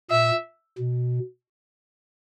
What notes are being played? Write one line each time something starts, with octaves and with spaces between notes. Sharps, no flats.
A#2 E5
B2